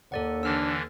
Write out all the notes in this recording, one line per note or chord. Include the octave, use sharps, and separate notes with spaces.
D#2 A4 D5 F#5
D3 E3 D4 E6 F6 A6